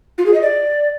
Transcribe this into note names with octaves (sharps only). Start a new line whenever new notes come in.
F4
G#4
D#5
D5